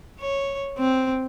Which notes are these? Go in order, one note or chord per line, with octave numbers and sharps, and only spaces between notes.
C#5
C4